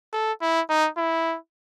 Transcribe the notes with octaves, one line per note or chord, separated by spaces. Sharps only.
A4
E4
D#4
E4